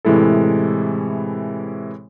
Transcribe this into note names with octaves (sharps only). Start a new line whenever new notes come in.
A2 C3 E3 G#3 E4 A4